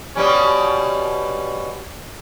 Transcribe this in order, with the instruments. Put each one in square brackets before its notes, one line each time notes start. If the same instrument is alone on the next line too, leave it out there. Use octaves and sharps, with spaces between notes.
[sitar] B2 G3 C#4